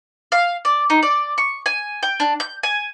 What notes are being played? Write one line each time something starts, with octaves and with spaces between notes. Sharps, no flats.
F5
D5
D#4
D5
C#6
G#5
G5
D4
G6
G#5